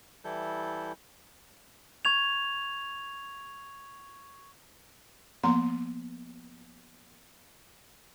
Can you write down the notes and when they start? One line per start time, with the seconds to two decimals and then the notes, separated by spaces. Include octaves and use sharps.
0.25 E3 G3 E4 A4 G6
2.05 C#6 G#6 F7
5.43 F3 A#3 B3 A#5 C6